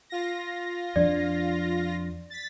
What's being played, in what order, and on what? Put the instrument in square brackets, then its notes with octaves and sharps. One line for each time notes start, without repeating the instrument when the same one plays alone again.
[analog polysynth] F4 A#6
[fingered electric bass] F2 F3 D4 [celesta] D5
[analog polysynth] A6 B6